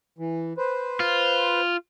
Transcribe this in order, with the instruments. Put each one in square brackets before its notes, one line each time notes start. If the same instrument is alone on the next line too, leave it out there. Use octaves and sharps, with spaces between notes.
[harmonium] E3
B4 C5
[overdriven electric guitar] F4